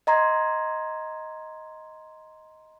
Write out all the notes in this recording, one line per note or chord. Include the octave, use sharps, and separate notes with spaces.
D#5 A#5 C6 G#6